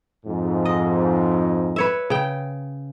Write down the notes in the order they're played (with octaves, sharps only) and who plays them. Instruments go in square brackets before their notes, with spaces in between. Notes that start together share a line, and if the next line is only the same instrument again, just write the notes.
[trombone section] F2 G#2
[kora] D#5
B4 C#5 E5
C#3 G5